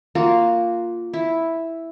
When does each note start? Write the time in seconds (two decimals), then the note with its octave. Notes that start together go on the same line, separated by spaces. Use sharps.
0.15 A#3 F4 F#4
1.13 E4